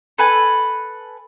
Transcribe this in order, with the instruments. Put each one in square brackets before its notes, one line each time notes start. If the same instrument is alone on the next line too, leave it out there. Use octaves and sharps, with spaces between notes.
[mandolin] A4 B4 G#5